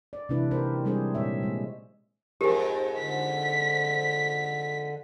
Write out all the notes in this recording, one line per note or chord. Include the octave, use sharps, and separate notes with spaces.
D5
C3 E3 G#3 D4 E4 B4
C4 D#4 G4 A#4 C5
G3 G#3 C4 D4 G#4 C5
A#2 G#3 C#5 E5
G#3
F2 G#2 G4 A#4
D3 B6